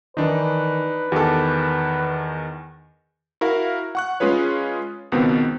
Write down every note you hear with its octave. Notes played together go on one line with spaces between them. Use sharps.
D#3 E3 D4 D#4 B4
E2 D#3 G4 A4
E4 F#4 A#4 F5
F#5 C#6 F#6
G#3 C#4 F4 G#4 B4 C#5
C#2 B2 D#3 B3 C4